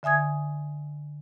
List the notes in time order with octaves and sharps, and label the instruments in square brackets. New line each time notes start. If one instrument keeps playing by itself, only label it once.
[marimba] D3 E5 G#5 D#6 G#6